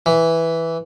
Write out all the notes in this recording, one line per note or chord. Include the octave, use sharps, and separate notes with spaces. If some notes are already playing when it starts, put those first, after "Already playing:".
E3